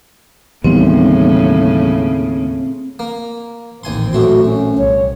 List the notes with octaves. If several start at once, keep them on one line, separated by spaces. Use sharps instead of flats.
D#2 A2 C#3 E3 G3 B3 C4
A#3
A1 D#2 A#2 C4 G#5 C6
F#2 A3 F#4 C6
C#4
C2 C#5